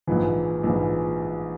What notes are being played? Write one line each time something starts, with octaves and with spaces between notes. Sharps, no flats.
A#1 G#2 E3 F3
A#1 G#2 E3 F3